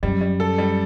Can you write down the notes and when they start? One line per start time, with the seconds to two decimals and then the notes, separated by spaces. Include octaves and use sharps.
0.03 F#2 G3
0.21 G3
0.40 A4
0.58 G3